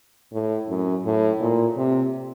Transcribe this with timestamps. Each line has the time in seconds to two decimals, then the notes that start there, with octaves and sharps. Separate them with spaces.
0.33 A2
0.69 F#2
1.05 A2
1.41 A#2
1.77 C3